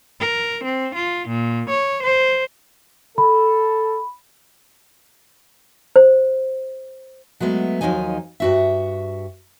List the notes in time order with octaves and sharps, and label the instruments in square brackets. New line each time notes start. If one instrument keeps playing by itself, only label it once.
[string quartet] A#4
C4
F4
A#2
C#5
C5
[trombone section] A4 [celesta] B5
[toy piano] C5
[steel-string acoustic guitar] F#3 G#3 A3 B3
D#2 A#2 F3 F#3 D#4 G#5
G2 F#4 E5